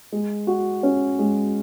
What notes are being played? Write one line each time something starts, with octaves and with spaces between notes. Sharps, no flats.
G#3
F#4
C#4
G#3